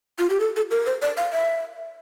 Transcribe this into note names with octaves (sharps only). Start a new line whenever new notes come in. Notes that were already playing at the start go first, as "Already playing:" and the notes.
F4
G4
A4
A4
A#4
C5
D5
F5
E5